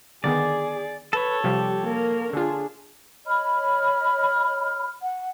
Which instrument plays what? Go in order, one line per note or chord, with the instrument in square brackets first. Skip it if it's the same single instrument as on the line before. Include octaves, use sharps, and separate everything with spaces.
[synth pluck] D3 D#3 B3 [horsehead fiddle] G#4 [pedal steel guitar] D5
[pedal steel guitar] A4 C#5 [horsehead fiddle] B4
[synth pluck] C3 F3 G3 [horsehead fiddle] G4
[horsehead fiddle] A#3 A#4
[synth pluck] D3 F4 [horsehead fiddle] D4 G#4
[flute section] C#5 D#5 B5 F6
F#5